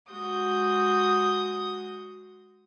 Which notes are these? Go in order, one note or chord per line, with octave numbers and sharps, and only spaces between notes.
G#3 F#4 D#6 G6